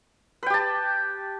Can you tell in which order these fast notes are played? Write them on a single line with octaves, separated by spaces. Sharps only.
B4 G5 G4 A5